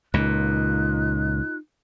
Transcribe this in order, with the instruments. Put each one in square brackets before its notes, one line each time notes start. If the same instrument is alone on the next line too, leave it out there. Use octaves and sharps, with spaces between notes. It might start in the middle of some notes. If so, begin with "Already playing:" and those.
[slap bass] C#2 A#2 [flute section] D#4 F4 F#6